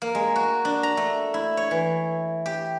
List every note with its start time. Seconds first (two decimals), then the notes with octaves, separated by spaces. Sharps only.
0.02 A#3
0.15 G#3
0.36 F#4
0.65 D4
0.83 A#5
0.97 A3
1.34 E4
1.57 C#5
1.71 E3
2.46 G4